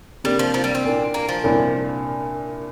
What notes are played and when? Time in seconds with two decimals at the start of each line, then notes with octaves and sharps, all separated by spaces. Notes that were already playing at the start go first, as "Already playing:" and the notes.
0.24 C3 G3 A#3 D4
0.39 F3
0.54 F3
0.64 G3
0.75 C4
0.84 A#2 A#3 D4
1.14 A#3
1.29 F3
1.44 C2 A#2 A#3 D4